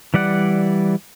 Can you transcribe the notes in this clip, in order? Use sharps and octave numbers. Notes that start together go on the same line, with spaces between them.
E3 G3 D5 F#5